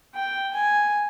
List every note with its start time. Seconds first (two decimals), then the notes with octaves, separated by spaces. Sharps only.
0.15 G5
0.54 G#5